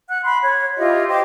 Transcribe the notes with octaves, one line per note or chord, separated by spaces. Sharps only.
F#5 F#6
B5 C6
C#5
E4 F4 G4 D#5
G4 C5 D#5